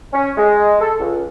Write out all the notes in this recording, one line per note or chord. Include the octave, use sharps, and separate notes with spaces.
C#4
G#3
A4
C#2